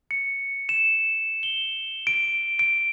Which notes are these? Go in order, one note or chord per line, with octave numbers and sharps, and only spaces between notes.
C#7
E7
G7
D7
D7